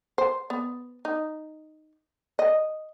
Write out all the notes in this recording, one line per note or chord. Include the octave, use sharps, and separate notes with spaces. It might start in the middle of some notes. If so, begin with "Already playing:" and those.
C5
B3
D#4
D#5